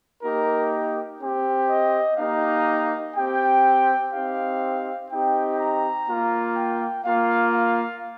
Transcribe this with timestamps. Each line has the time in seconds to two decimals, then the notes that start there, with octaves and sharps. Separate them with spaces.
0.23 A#3 D#4 G4 A#4
1.20 C4 G4
1.69 D#5
2.18 A#3 D#4 G4 F5
3.15 C4 G4 G5
4.13 C4 D#4 G4 F5
5.10 C4 D#4 G4 G5
5.59 A#5
6.08 A#3 F4
6.56 G5
7.05 A#3 F4 F5
7.54 F5